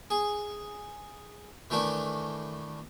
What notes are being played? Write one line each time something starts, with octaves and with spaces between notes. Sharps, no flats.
G#4
D#3 E3 A3 D4